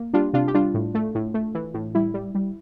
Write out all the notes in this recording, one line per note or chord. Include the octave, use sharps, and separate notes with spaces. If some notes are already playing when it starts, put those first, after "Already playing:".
Already playing: A#3
G3 D4 F4
C3 D4 F4
G4
G3 D4 F4
A2
A3
A2
A3
E3
A2
G3 E4
G3
G3